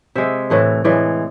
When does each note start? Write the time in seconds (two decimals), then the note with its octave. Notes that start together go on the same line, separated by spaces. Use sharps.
0.15 C3 G#3 E5
0.50 A2 E3 A3
0.84 A2 E3 G#3 D5